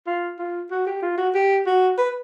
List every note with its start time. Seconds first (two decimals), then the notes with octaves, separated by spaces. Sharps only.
0.07 F4
0.39 F4
0.71 F#4
0.87 G4
1.02 F4
1.18 F#4
1.35 G4
1.66 F#4
1.98 B4